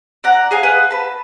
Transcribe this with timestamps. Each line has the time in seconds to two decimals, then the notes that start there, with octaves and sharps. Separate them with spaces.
0.24 D5 F#5 A#5
0.51 G#4 F5 G#5
0.63 B4 F5 F#5
0.91 B4 A5